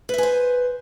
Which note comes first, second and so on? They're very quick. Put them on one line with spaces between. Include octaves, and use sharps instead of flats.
B4 E5 G#5 C5